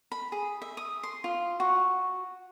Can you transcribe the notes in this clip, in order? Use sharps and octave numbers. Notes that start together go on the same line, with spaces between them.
B5
G#4
E5
D#6
C6
F4
F#4